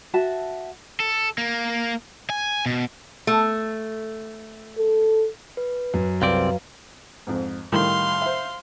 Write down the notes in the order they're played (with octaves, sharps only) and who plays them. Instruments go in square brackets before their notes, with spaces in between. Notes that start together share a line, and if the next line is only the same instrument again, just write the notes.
[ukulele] F#4 E5 A5
[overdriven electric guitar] A4
A#3
G#5
B2
[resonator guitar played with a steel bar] A3
[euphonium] A4
[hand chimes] B4
[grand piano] F#2
[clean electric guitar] C2 C4 D5 [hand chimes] B4 F5
[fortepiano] F2 G#2
[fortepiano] A2 D#3 G3 [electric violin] F5 C6
[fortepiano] C5 E5